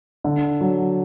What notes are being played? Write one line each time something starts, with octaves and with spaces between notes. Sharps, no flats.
D3
F#3